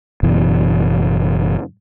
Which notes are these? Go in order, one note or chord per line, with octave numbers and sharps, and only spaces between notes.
F#1 F#2 B2 E3